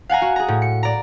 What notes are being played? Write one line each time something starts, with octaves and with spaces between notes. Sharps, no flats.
F5 F#5 G#5 A#5
F#4
G#4 A#5
A2
C#7
D5 A#5